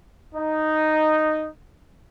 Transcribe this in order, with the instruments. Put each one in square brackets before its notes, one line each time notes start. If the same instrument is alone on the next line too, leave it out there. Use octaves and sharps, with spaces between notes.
[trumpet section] D#4